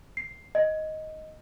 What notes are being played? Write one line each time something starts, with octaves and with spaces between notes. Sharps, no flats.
C7
D#5